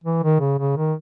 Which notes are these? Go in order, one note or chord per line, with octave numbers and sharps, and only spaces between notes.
E3
D#3
C#3
C#3
D#3